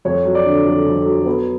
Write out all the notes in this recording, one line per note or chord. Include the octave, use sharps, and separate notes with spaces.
F2 C#5
F#3
D5
D3
F2
F2
F#3
B3